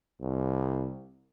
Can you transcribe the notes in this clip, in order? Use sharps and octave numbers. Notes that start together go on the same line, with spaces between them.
C2